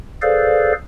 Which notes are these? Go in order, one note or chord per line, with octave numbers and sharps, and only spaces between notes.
G#4 A4 B4 C5 D5 F5